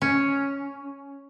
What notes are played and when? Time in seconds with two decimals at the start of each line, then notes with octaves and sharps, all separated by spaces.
0.02 C#4